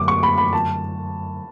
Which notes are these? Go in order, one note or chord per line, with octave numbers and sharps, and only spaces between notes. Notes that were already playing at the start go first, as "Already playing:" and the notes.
Already playing: F#2 D3 F#3 A3 D6
C#6
B5
B5
A5